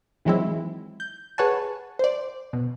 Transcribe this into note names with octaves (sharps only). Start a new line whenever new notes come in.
D#3 E3 F#3 G#3 C4 E4
G6
G#4 B4 C#5 F#5 G#5 A5
C5 D5
B2